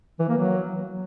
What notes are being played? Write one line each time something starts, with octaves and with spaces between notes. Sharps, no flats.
E3
A#3
F#3